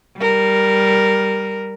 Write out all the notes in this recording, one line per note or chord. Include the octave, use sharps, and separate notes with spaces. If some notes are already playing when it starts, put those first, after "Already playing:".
G3 A#4